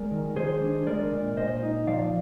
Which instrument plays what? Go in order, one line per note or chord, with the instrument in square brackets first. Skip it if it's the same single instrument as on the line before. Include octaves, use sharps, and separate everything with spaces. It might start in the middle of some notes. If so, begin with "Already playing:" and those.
Already playing: [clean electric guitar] G#3 A#4 D5
D#3
D#3 G#4 C5
D4
G#3 A#4 D5
A#2
A#2 C5 D#5
D#4
F3 D5 F5